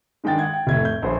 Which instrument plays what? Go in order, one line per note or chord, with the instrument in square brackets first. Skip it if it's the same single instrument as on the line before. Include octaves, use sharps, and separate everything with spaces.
[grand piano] D#3 G#3 D4 G5 A6
F#5 G#6
G5
F1 A2 G#6
G6
A#1 C5